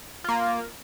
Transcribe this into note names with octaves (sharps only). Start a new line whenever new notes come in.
A#3 F4